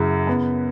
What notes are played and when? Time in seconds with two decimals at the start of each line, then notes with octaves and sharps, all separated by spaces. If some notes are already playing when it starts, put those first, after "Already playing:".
Already playing: F#2 C#3 E4
0.27 B3